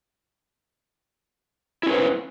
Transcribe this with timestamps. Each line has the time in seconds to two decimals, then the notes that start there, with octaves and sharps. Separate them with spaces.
1.83 E4
1.86 C#4
1.89 B4
1.92 C5